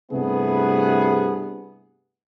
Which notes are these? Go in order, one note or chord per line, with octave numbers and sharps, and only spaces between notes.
G2 C3 A3 B3 E4 G#4